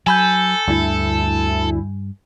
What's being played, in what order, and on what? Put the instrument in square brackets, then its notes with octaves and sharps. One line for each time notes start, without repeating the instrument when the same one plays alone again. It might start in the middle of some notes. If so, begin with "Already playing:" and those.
[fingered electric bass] F#3 [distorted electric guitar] A4 [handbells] G#5 B5 G6
[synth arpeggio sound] D2 E4 [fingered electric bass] G2